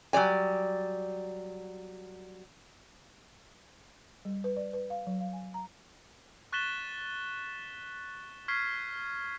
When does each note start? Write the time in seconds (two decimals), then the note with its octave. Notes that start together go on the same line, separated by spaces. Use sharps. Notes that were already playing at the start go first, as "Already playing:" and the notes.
0.13 F#3 G3 D5 G#5
4.25 G3
4.44 B4
4.56 D5
4.73 B4
4.90 F5
5.07 F#3
5.21 F5
5.33 G#5
5.54 A#5
6.52 C#6 F#6 A6 B6 E7 G7
8.48 C#6 F6 G#6 B6 C7